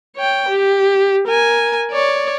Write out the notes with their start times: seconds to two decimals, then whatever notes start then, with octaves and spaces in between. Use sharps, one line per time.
0.16 C#5 G5
0.49 G4
1.27 A#4 G#5
1.91 C#5 D5